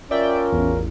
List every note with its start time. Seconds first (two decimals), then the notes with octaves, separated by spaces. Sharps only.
0.11 C#4 F4 A#4 D5 E5 G5
0.52 A1 E2